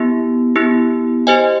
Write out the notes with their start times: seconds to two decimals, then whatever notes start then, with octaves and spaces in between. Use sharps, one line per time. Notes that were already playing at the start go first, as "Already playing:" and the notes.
Already playing: B3 E4 G4
0.56 B3 E4 G4
1.27 G4 C5 D#5 G#5